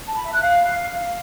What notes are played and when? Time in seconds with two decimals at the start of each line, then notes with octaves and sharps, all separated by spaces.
0.06 A5
0.15 B5
0.24 E5
0.33 F#6
0.41 F5